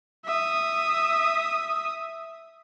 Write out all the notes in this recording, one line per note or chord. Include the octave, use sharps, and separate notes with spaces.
E5 D#6